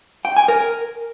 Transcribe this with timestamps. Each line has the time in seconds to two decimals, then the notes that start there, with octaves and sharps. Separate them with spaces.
0.25 G5
0.37 G#5
0.48 A#4